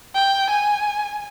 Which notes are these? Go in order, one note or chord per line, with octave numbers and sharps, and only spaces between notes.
G5
G#5